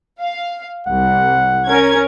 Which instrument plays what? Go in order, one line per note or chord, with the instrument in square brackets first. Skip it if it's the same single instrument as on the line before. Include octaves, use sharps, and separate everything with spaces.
[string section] F5
[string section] C2 [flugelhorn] F#5
[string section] C#4 A#4 G#6